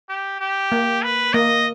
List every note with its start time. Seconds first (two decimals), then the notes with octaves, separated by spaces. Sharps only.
0.09 G4
0.40 G4
0.72 A#3
1.03 B4
1.34 A#3 D#5